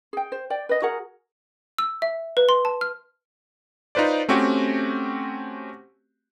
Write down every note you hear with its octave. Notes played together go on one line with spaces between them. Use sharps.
G#4 G5
C5
D5 G5
B4 D#5
F#4 G#4 A#4 F#5
E6
E5
B4
C6
A5
F6
D#4 F4 B4 C5 D5
A3 C4 C#4 F#4 G4